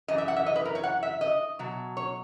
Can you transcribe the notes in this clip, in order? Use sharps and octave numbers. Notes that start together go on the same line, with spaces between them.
F#2 E3 D#5
E5
F#5
E5
D#5
B4
A#4
C#5
F#5
E5
D#5
B2 F#3
C#5